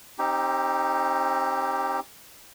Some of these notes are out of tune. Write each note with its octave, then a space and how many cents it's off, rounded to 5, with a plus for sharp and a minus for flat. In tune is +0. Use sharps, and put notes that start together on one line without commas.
C4 +40 D#4 +0 G4 +0